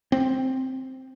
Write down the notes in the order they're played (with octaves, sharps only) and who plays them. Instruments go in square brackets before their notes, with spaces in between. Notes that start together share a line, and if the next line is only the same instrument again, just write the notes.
[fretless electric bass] C4